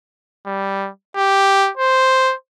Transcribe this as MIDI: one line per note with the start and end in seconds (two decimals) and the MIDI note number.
0.46 0.89 55
1.16 1.70 67
1.77 2.34 72